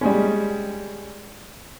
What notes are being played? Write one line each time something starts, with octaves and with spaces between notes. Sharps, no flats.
G3 G#3 C#4